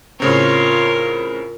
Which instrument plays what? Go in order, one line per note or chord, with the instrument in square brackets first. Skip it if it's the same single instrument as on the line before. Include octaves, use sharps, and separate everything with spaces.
[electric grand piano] A2 C#3 C4 [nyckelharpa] F4 C#5 [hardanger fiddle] A#4